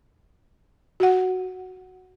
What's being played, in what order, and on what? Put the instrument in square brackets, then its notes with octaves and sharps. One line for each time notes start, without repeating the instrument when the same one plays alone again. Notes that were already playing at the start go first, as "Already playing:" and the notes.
[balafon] F#4 F#5